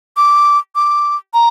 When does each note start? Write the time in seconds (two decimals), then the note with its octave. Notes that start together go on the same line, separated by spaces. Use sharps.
0.17 D6
0.75 D6
1.34 A#5